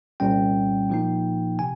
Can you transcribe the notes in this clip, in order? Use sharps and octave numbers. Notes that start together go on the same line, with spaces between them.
C2 A#2 G3 C#4 G5
A#2 F3 A#3 D#4
C3 G#5